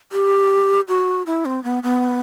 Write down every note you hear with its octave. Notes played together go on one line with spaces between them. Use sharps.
G4
F#4
E4
C4
B3
B3